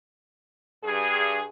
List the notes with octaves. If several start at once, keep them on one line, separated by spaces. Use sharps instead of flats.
G2 G#4